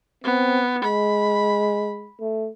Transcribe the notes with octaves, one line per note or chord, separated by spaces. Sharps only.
B3 C4
G#3 B5
A3